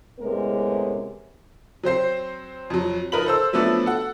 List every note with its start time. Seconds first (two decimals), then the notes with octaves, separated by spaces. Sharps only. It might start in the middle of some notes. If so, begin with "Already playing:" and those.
0.20 A2 C3 G#3 B3 C#4 A#4
1.83 F#3 C4 C5 C7
2.70 F2 F#3
3.12 F3 D#4 A#4 B4 B5 F#7
3.26 A4 C5 E6
3.53 F3 F#3 A3 B3 D4
3.86 A4 F#5